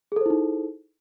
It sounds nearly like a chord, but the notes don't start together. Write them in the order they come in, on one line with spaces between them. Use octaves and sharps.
G#4 A4 C5 E4 D#4